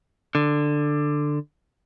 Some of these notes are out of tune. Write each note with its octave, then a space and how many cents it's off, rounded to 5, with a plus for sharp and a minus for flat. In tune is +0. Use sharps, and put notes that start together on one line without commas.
D3 +10